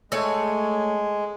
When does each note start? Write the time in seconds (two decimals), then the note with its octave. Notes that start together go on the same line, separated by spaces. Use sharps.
0.12 G#3 A3 C#5 G#5